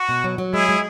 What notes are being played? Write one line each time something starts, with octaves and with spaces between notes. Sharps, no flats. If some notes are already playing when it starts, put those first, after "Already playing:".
Already playing: F#4
B2
F#3
F#3
G#3 E4 G#4
G#3